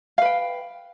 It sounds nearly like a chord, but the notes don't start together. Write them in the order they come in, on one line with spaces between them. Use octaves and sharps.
F5 B4 G5